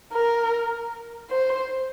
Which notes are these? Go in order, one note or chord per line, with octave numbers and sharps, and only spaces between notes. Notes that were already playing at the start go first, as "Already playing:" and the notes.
A#4
C5